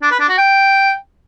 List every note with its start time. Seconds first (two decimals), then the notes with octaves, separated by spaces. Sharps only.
0.02 D4
0.11 B4
0.20 D4
0.29 F#4
0.38 G5